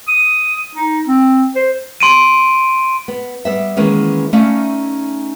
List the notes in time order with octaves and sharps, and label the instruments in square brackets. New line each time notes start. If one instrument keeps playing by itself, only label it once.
[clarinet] D#6
D#4
C4
C5
[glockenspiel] C6 D7 D#7
[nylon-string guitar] B3
G3 B3 E5
D#3 E3 G#3 A#3 B3 C#4
A3 C#4 D#4 D5 E5 F5